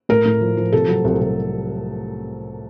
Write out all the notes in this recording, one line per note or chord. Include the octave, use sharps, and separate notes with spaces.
A2 A#4
A2
F3
F3
C3 A4
F#3
C2
C2